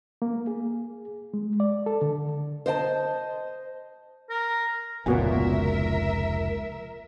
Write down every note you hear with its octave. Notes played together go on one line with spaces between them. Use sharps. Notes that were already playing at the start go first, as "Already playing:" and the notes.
A#3
G#4
G#3
D5
A4
D3
C5 D#5 G5 A5
A#4
F1 C#2 A#2 B3 F#4 A#4 E5 G#5